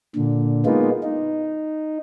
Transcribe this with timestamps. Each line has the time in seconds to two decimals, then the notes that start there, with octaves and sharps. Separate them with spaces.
0.16 A#2 D3
0.66 G#3 A#3 B3 D#4 F4
1.03 D#4